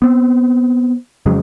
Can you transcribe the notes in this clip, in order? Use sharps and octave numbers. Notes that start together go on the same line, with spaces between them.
B3 C4
F2 C#3 F#3 G#3